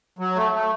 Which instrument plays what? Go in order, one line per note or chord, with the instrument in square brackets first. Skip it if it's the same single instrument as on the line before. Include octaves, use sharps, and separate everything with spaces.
[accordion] F#3
A3
A3